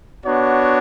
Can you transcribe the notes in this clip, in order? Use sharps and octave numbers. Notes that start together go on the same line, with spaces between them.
B3 D4 F#4 C#5